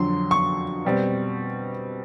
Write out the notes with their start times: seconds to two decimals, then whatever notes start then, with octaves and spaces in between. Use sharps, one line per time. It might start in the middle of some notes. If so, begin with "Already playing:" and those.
Already playing: F2 D3 F#3 C6
0.31 C#6
0.85 B2 G3 C4